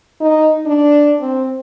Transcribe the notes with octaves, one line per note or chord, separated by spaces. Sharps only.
D#4
D4
C4